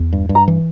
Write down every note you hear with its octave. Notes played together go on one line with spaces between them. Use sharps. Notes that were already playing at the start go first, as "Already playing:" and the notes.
Already playing: E2
G2
G2
A#5
E3